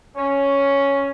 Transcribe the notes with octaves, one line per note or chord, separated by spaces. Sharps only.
C#4